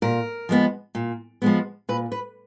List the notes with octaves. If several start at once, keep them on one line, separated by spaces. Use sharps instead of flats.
A#2 A#4
F3 G#3 B3
A#2
F3 G#3 B3
A#2 B4
B4